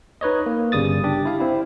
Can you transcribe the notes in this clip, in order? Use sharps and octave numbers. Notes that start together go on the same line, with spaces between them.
D#4 B4 C#5 D#5
A#3
G1 C#3 G3 D#6 A6
D4 G4
E4 F5
C4 E4